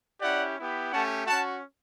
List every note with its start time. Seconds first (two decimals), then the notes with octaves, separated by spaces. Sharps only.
0.21 C#4 E4 G4 D5 F#5
0.57 B3 E4 G4
0.91 A3 C#4 G4 F#5 A5
1.26 C#4 F#4 F#5 A5